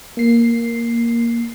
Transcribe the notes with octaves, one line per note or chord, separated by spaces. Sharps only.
A#3 C7